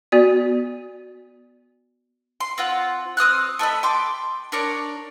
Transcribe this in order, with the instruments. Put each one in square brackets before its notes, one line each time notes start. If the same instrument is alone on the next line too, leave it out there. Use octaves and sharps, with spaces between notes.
[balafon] B3 F#4 D5
[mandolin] C6
C4 F4 F#5
C4 D#6 F6 F#6
A3 A4 D#5 B5
G5 C6 D6
D4 A#4 C#5 D5